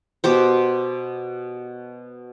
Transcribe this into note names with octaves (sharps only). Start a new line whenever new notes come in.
B2 G4 C5